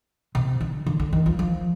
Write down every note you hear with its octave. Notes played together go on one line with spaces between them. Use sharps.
C3
D3
D3
D3
D#3
F3
F3